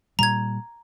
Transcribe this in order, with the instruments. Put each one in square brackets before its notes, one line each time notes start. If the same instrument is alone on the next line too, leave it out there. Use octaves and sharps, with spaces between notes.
[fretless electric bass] A#2 G3 [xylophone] A#5 G#6